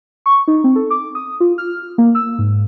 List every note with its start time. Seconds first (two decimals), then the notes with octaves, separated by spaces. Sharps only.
0.26 C#6
0.48 D#4
0.64 C4
0.76 A4
0.90 D6
1.15 D#6
1.40 F4
1.58 F6
1.98 A#3
2.15 E6
2.38 G#2